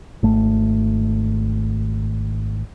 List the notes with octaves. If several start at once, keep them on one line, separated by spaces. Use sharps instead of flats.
G#1 A3